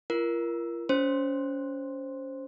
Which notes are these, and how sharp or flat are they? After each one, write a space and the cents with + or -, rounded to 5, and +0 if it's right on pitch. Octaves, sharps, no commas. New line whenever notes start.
F4 -40 A#4 +15
C#4 +25 C5 +5 C6 +0